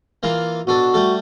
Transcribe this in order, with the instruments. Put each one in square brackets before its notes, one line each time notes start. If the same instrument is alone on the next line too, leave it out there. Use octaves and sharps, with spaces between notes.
[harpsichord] E3 A#3 F4
[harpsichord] B2 D4 A4 [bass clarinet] F#4
[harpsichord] G3 A3 A4